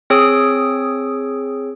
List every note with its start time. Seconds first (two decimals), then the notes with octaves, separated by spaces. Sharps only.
0.10 C4 G#4 C#5 D#6 E6 D7